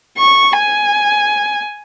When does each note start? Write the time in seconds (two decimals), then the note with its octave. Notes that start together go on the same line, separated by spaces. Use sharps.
0.18 C#6
0.57 G#5